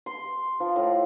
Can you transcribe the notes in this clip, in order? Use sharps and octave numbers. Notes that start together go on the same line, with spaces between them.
C6
F3
A2